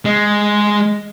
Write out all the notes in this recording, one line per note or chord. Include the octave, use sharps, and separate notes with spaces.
G#3